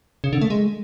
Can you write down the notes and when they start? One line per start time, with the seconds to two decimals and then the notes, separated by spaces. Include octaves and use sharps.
0.24 C#3
0.33 D3
0.41 A3
0.50 G#3